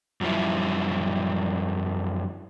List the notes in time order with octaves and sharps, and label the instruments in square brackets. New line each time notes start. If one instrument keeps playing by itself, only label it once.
[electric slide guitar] F#2 F3 G3 E4